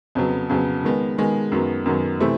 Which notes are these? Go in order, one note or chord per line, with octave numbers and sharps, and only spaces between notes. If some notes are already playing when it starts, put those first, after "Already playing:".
F2 C#3 F#3 B3
F2 C#3 F#3 B3
D#3 G#3 B3
D#3 G#3 B3
F#2 D#3 F#3 B3
F#2 D#3 F#3 B3
C3 E3 A3 C4 E4